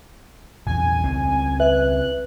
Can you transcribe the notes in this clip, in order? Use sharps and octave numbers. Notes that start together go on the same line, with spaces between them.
A#1 E2 G#5
C#2 C4
B4 E5 F#6